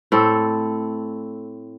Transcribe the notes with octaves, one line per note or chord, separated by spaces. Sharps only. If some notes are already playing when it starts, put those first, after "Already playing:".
A2 C4 A4